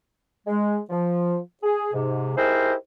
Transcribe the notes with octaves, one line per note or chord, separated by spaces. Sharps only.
G#3
F3
G#4
G#2 C3
D#4 E4 G4 G#4 A#4 C5